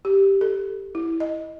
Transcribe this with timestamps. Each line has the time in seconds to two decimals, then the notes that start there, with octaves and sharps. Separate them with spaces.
0.05 G4
0.41 A4
0.95 E4
1.20 D#5